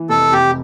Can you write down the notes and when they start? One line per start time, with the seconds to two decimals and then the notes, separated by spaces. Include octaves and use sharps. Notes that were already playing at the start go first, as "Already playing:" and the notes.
Already playing: E3
0.10 F1 A4
0.32 F1 G4